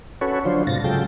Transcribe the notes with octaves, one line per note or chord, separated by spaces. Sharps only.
C#4 F#4 A4 B4 C#5
D3 F3 F#3 D4 F4 C5
G#2 C3 F4 A6 A#6
C#3 F#3 G#3 F4 A4 G5